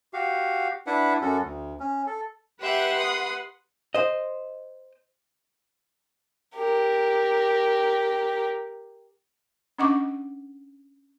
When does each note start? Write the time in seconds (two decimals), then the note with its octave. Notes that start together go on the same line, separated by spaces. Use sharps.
0.13 F#4 G4 F5
0.87 D4 E4 B4 E5 F#5
1.21 F#2 C#4 F#4 A4
1.43 D2
1.80 C#4
2.07 A4
2.60 G4 B4 E5 F#5 C6
2.99 D#6
3.94 C5 D#5
6.56 G4 A#4
9.78 C#4 D4 D#5 F#5 C#6 D6